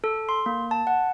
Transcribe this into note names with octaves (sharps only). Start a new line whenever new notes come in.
A4
C6
A#3
A5
F#5